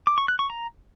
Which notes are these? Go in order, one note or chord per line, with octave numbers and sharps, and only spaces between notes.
D6
C#6
F#6
C#6
A#5